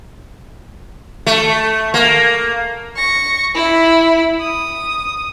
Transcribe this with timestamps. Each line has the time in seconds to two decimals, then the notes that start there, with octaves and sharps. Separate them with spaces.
1.27 A3
1.94 A#3
2.96 C#6 A#6
3.54 E4 B5
4.41 D#6